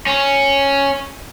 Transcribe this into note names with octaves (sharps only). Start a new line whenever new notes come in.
C#4